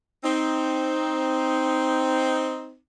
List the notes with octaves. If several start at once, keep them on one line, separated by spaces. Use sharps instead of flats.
C4 D#4